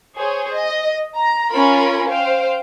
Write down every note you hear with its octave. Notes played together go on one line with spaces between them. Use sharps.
G#4 C5 C#5
D#5
A#5
C#4 F4 A#4 B5
C5 F5 G5